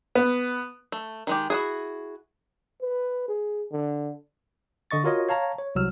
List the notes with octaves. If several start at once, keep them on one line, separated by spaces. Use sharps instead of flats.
B3
A3
D#3 G#3 G4
E4 F#4 G#4
B4
G#4
D3
D3 D#5 C#6 A6
F4 F#4 A#4 C#5 D#5
C#5 F5 A5 A#5
C#5
C2 F#3 E6 F6